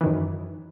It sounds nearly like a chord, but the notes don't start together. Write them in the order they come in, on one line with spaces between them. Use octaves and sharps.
E3 D#3 F#2